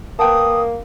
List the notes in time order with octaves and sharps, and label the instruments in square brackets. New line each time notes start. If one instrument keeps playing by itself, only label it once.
[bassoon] A#3 [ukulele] B4 G5 A5 [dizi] D#6